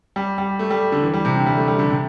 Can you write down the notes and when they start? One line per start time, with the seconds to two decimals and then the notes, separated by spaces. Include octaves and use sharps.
0.16 G3
0.38 G3
0.59 A3
0.71 G3
0.92 D3
1.03 E3
1.14 G3
1.25 C3
1.36 D3
1.47 G3
1.57 A3
1.68 G3
1.79 D3
1.90 C3